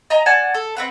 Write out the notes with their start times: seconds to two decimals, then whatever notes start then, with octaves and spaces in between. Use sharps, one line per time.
0.10 D#5 G#5 A#5
0.26 D5 F#5 G#5 A5
0.54 A4
0.77 C4 B4 F#5